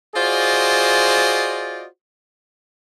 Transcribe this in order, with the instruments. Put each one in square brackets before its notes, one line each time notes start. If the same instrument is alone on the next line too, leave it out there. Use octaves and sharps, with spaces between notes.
[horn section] F4 F#4 G#4 C5 D5 D#5